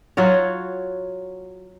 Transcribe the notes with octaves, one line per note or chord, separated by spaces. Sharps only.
F#3 F4 F#4 C#5